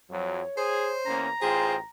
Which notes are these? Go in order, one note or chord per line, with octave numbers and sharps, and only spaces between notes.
F2 F#3 C#5
G#4 C5
E2 A#3 C#4 A#5
A1 F4 G#4 C5 G5